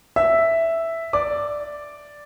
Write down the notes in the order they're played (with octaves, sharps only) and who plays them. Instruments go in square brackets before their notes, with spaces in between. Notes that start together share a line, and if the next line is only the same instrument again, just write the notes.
[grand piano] E5 E6
D5 D6